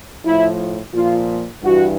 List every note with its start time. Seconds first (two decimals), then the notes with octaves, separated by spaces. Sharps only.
0.25 A2 F3 E4
0.94 A#2 F3 F4
1.63 G2 E3 F#4